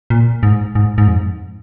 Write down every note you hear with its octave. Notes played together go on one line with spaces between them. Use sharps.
A#2
G#2
G#2
G#2
F2